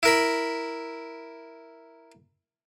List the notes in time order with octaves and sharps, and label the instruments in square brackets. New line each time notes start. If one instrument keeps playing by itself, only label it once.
[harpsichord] E4 A#4 B5